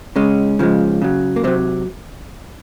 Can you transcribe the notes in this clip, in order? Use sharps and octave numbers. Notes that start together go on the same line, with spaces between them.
C#3 G#3 C#4
C#3 F3 G#3
C#3 F#3
A#3
C3 F#3 C4